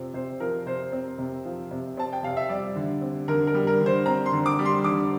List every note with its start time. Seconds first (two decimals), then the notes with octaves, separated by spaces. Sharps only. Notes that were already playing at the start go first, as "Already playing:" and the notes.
Already playing: C3 F3 C4
0.14 C3 C5
0.40 F3 A#4
0.66 C3 C5
0.92 C4
1.18 C3
1.45 F3
1.71 C3
1.97 C4 A5
2.13 G5
2.23 C3 F5
2.37 E5
2.49 G3 D5
2.76 D3
3.01 C4
3.28 D3 A#4
3.47 A#4
3.54 G3
3.67 A#4
3.80 D3
3.86 C5
4.06 C4 A#5
4.26 C6
4.32 D3
4.46 D6
4.59 G3
4.66 C6
4.84 D3 D6